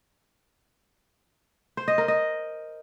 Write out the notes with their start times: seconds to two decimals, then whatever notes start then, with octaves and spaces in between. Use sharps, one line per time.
1.77 C5
1.88 D#5
1.98 A#4
2.08 D#5